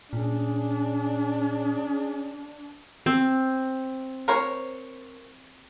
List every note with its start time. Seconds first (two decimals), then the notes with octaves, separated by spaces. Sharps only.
0.13 A#2 C#4 D4 G#4
3.06 C4
4.28 A#4 C5 C#5